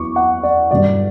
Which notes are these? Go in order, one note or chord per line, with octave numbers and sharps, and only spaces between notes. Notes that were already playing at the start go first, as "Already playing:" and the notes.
Already playing: E2 F#3 C#6 D6
F#5
D5
G2 D3 F#3 D5